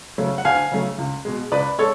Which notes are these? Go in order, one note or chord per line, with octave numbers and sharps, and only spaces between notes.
C#3 F#3 A3
F#5
D2 F5 G#5
C#3 F#3 A3
C#2
B2 G#3
C#2 B4 D5
G#3 A4 C#5